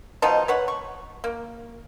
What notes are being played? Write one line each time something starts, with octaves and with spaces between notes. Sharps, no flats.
B2 F3 D#4
B4 C#5 F#5
C#6
A#3